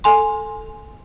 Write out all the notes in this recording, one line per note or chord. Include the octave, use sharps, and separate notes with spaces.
A4 G#5 C6